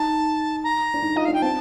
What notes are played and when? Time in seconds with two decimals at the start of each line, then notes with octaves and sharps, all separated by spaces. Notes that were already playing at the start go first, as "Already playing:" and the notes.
Already playing: D#4 A5
0.64 A#5
0.94 D4
1.03 D#4
1.16 F4 D#5
1.25 D4 F5
1.34 G5
1.42 C4 A5